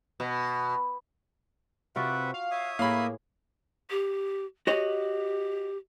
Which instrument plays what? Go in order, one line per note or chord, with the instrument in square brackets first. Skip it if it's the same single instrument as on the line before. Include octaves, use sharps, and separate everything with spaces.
[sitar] B2
[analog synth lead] C3 [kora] F4 F#4 D5 [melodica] B4 E5 F#5
[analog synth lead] F5
[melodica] C#5 E5 D#6
[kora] A2 G#4 [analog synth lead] A#3 [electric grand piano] F5 B5
[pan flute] G4
[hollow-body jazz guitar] F#4 C#5 D#5 [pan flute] G4